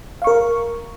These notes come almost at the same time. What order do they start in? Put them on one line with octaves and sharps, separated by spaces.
F5 C#6 A#4